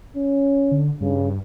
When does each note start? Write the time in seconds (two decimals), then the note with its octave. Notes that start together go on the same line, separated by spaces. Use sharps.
0.17 C#4
0.72 D3
1.01 G2 C#3